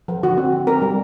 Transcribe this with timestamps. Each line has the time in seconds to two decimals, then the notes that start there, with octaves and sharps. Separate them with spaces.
0.08 F3
0.23 D3 F#4
0.37 C4
0.52 D3
0.67 C4 A#4
0.82 G3